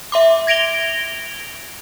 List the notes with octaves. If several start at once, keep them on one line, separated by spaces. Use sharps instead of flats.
E5 C6 D6
G#6 A#6 D7 F7 G7